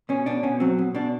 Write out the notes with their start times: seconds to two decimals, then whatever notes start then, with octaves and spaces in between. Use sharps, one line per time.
0.09 B2 C#4
0.26 B2 D4
0.43 B2 C#4
0.60 F#3 C4
0.79 B2
0.95 B2 D4